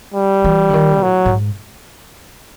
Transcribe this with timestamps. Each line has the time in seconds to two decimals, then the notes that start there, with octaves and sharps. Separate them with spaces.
0.14 G3
0.44 E3
0.69 D3
0.73 D#3
1.03 A2 F#3
1.26 G#2